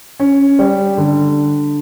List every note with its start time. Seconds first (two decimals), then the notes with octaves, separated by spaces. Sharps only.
0.20 C#4
0.59 G3
0.98 D3